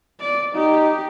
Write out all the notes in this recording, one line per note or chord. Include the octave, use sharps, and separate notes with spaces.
D5
D#4 G4